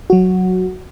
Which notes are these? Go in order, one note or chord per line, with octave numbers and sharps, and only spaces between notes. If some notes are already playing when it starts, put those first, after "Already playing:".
F#3 F#4